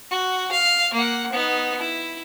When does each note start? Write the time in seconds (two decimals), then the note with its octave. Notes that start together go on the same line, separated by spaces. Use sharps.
0.10 F#4
0.52 F5
0.94 A#3 F#5
1.32 B3 D#4
1.79 E4